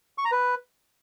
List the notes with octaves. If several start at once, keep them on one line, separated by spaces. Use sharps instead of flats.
C#6
A#5
B4